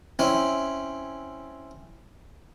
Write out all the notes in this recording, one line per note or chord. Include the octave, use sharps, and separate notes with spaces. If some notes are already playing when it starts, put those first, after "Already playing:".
C4 C#4 E4